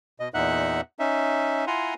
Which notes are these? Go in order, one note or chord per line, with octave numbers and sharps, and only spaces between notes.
B2 D#5
E2 A#2 D#4 E5 F#5 F#6
C#4 D#4 E5
E4 F4 F#5 G#5 A#5 C6